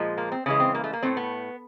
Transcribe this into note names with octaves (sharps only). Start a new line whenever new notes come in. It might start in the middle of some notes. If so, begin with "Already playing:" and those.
Already playing: A#2 F3 G#3
A#3
C4
C#3 E3 G#3 C#4
C4
A#3
A3
A#3
A2 F#3 A3 C4
B3